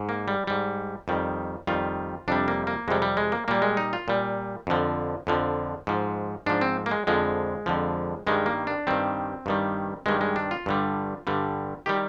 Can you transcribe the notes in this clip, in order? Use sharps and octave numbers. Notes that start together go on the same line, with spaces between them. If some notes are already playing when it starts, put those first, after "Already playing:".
Already playing: G#2
A#3
G3
G#2 G3
F2 D#3 G3
F2 D#3 G3 F4
F2 C3 G3 D4
A#3
A#3
F2 C3 G3 G#3
G3
G#3
A#3
A#2 G3 A#3
G#3
D#4
F4
A#2 G3
F2 D3 F3
F2 D3 F3
G#2 F3
G#2 F3 D4
C4
A#3
G#3
F2 D3 F3 G#3
F2 D3 F3
G2 D#3 G3 G#3
A#3
D4
G2 D#3 G3 C4
G2 D#3 G3
G2 D#3 G3 G#3
G#3
D4
F4
G2 D3 G3
G2 D3 G3
D#3 G3 G4